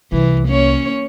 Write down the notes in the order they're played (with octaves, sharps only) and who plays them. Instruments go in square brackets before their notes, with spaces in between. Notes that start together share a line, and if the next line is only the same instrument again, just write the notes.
[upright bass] C2 [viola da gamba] E3
[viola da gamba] A#3 C#4 C#5